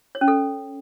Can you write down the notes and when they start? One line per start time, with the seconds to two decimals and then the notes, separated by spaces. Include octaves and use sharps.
0.15 C#5
0.21 C#4
0.28 A4